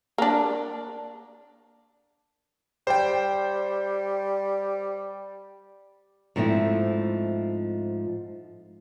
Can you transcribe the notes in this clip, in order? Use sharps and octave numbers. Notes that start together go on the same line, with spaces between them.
A#3 D4
G3 C5 G5
G#2 F3 A3 C4 E4